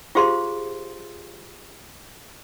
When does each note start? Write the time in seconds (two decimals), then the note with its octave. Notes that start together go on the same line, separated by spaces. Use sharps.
0.15 F4 G4 G#4 C5 F5 C6